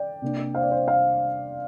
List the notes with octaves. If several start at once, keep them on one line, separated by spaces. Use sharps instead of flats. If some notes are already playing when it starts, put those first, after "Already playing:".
Already playing: D5 G5
C3 A#3 D4
C5 F5
D5
C5
C5 F5